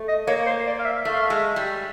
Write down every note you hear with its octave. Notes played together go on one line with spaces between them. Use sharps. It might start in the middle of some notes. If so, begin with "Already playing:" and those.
Already playing: A3
D#5
A#3 C#5
C5
D5
F5
E5
A3 E5
F5
E5
G#3
G3